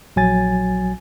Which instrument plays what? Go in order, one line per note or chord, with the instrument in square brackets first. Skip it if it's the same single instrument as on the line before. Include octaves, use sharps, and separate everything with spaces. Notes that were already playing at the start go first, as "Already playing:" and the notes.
[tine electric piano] A#1 F#3 G#5 A6